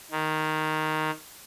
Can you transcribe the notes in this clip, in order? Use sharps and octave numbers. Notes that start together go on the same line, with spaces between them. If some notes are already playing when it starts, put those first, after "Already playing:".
D#3